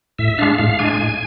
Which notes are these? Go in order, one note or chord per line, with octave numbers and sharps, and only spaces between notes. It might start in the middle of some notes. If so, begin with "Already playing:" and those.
A2 E5
G#3 D4 F5
A2 F5
G#3 D4 G#5
A2